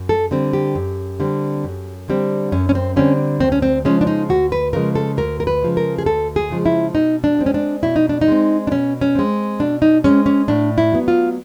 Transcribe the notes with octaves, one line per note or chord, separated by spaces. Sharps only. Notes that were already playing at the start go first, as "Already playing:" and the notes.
Already playing: F#2
A4
D3 G3 C4
G4
F#2
D3 G3 C4
F#2
D3 G3 C4
F#2 C#4
C#4
C4
D3 G3 C4 C#4
D2 C4
C#4
C4
C#3 F3 G#3 C#4
D4
D#4
D2 F#4
B4
C#3 F3 G#3 A#4
A4
D2 A#4
A#4
B4
C#3 F3 G#3
A#4
G#4
D2 A4
G#4
C#3 F3 G#3
E4
B2 D#4
D4
G#3 C4
C#4
D4
B2 E4
D#4
D4
D#4
G#3 C4
D4
B2 C#4
C#4
G#3 C4
B2 D4
D#4
G#3 C4 C#4
C#4
A2 D4
E4
F#3 B3
F4